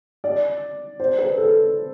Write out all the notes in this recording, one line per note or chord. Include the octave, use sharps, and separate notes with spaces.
D5
C5
B4
A4